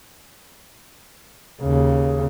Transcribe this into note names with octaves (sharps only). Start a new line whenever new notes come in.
D#2 C#3